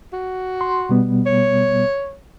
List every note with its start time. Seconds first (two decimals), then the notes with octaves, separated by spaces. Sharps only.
0.13 F#4
0.61 C6
0.89 B2 G3 B3
1.26 C#5